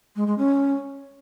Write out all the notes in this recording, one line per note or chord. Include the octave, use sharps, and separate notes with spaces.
G#3
G#3
C#4